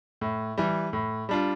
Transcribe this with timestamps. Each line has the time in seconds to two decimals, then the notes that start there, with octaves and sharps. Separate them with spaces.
0.21 A2
0.58 E3 G3
0.93 A2
1.29 G3 D4 F4